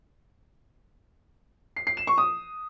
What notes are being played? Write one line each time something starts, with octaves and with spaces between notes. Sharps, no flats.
C7
C7
E7
C#6
D#6